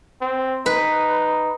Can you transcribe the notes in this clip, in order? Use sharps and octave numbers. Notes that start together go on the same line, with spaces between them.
C4
D#4 B4